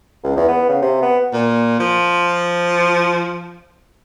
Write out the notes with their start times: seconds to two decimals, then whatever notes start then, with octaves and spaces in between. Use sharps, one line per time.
0.24 C#2
0.37 E2
0.48 B3
0.69 C#3
0.82 C3
1.02 B3
1.33 A#2
1.80 F3